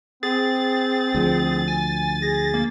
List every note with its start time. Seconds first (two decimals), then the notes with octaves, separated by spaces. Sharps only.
0.23 C4 G#4 A6
1.15 D2 F3
1.68 G#5
2.22 G#4 A#6
2.54 A#3